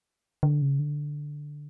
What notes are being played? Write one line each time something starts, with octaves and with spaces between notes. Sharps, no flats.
D3
C#3
D3